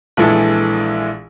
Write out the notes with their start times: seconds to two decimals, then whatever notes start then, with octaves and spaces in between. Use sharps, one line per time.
0.17 A#1 E3 G#3 E4 A4